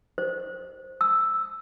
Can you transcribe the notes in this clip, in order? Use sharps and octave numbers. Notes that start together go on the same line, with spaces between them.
C5
E6